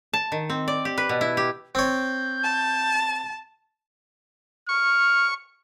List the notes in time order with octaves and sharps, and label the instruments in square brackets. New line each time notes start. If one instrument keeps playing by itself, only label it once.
[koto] A5
D#3
C4
D5
G4
B4
B2
E4
G4
[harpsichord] C4 C#5 [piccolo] G6
[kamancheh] A5
[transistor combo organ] C#6 [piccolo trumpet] F6